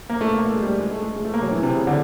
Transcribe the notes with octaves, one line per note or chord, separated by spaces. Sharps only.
A#3
A3
A#3
A3
G#3
G3
G#3
A3
G#3
G#3
A3
A#3
F#3
E3
C3
C#3
D3